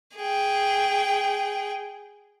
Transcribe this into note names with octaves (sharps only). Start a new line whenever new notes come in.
G#4 G5